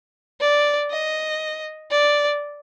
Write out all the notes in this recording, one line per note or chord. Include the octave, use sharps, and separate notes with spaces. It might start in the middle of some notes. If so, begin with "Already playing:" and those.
D5
D#5
D5